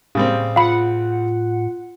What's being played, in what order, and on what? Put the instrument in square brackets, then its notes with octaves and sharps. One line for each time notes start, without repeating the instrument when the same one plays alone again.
[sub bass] A2 [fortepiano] C#3 G3 C4
[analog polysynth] F4 F#5 [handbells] F5 B5